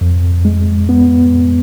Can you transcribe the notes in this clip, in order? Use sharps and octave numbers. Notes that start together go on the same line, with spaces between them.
F2
G#3
B3
F2